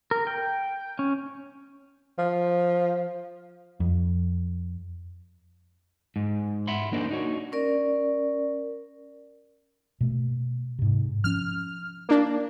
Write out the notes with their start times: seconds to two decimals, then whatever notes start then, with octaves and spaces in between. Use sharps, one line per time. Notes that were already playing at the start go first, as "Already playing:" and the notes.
0.11 A#4
0.27 G5
0.99 C#4
2.19 F3
3.80 F2
6.16 G#2
6.67 E5 F#5 B5 C6
6.92 A#3 D4 D#4 A#4 C5
7.09 D4 D#4 F#4 C#5
7.52 C#4 A#4 D5
10.01 B2 A3
10.79 G#2 C3
11.24 F3 C#4 F6
12.09 A#3 D4